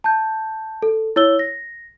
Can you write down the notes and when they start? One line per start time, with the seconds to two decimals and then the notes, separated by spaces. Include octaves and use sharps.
0.04 A5 G6
0.82 A4
1.16 E4 C#5 E6 G7
1.39 A#6